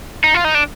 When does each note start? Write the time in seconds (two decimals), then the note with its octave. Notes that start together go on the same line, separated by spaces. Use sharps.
0.24 D#4
0.34 F4
0.44 D#4
0.55 D4